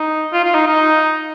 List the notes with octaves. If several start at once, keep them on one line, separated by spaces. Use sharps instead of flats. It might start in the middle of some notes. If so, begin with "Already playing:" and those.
Already playing: D#4
F4
F4
D#4
D#4